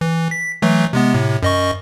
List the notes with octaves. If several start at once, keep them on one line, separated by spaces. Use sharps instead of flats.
E3
B6
E3 F#3 A3
C3 G#3 B3
A2 C3
F#2 D#5 C#6